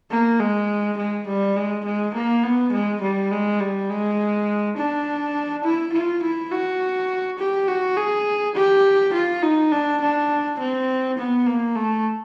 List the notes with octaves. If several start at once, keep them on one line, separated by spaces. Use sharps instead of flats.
A#3
G#3
G#3
G3
G#3
G#3
A#3
B3
G#3
G3
G#3
G3
G#3
D4
E4
F4
E4
F#4
G4
F#4
G#4
G4
F4
D#4
D4
D4
C4
B3
A#3
A3